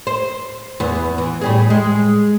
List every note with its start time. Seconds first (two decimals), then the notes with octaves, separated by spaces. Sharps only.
0.07 C5
0.80 E2 B3
1.18 E3
1.41 A2 G3 G#4
1.70 G#3